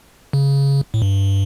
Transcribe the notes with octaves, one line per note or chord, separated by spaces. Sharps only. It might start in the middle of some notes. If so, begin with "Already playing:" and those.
C#3
A2
G2